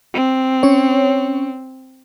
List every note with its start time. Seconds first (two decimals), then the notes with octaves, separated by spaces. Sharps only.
0.14 C4
0.63 C#4 C#5